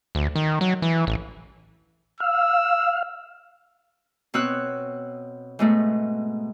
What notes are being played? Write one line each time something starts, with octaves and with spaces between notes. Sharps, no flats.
D2
D#3
F#3
E3
A1
F5 E6
B2 C4 C#5 E6 F#6
G#2 B2 A3